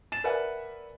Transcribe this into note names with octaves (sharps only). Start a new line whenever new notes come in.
A6 E7
A#4 B4 D5 E5 F#5 G#5